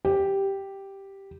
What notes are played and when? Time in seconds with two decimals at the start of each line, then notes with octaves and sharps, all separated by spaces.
0.05 G4